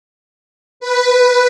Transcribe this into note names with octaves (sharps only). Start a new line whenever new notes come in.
B4